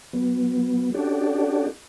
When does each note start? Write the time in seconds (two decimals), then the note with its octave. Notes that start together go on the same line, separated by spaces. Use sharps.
0.13 F#3 B3
0.94 C#4 D4 F#4 G4 A4 D5